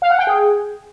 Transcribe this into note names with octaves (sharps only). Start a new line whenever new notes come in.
F5
F#5
G5
G#4